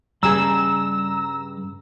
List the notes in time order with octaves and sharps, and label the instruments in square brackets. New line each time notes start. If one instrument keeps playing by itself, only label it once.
[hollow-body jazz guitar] G2 C#3 G#4 [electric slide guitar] G3 D5 D#5 [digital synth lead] A#5 [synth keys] E6